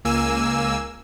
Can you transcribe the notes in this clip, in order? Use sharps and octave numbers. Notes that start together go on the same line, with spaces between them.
C#2 A#3 G#5 E6